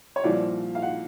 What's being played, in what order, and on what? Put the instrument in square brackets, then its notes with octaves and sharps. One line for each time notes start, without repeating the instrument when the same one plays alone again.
[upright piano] C#5
C2 A#2 F3 D5
F5
F#5